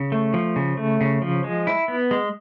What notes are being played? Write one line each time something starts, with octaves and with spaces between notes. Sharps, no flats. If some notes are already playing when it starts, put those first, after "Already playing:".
Already playing: C#3
A3
F3
C#3
A3
C#3
F3
G#3
E4
B3
G#3